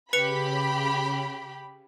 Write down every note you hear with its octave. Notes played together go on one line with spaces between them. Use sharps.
C#3 G4 B4 B5 C#7 F7